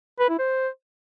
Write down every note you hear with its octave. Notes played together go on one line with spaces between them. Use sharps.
B4
E4
C5